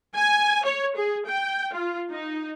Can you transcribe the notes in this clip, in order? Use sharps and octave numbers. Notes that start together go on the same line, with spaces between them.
G#5
C#5
G#4
G5
F4
D#4